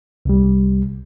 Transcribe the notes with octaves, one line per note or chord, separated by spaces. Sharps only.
C2 C3 G3